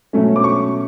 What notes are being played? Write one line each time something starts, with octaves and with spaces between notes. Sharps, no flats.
B2 F#3 A3 C#4
D6
C#6